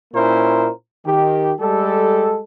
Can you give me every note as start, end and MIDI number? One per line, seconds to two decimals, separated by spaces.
0.14 0.70 46
0.14 0.70 58
0.14 0.70 61
0.14 0.70 64
0.14 0.70 70
0.14 0.70 72
1.05 1.52 51
1.05 1.52 67
1.60 2.40 55
1.60 2.40 56
1.60 2.40 67
1.60 2.40 69